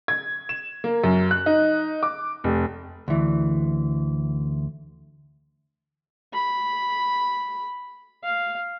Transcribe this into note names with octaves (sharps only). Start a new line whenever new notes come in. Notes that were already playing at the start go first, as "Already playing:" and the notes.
G#6
E7
A#3
F#2
F#6
D#4
D6
F1
D2 E3
B5
F5